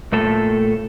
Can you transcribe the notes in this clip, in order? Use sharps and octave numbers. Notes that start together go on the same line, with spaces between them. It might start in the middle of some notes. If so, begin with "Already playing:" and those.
A#2 A3 A4